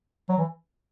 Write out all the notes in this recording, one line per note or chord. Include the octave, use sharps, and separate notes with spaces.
F#3
E3